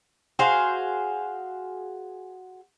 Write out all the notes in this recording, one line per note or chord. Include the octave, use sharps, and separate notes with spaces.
F#4 G#4 C5 F5